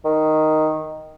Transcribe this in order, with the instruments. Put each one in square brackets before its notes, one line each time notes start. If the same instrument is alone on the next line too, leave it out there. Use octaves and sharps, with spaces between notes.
[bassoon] D#3